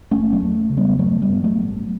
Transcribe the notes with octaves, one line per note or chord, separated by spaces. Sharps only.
F#1 A3 C#4
F#3 A3
E2
C#3
G3 B3
G2 F#3 A3
G3 B3
G2
F#3 A3
A1